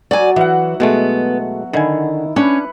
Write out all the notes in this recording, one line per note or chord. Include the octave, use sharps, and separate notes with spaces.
F#3 D5 G#5
E3 E5 F#5
B2 G#3 A3 B3
D3 D#3 E4 G#5
C#4 D4 B4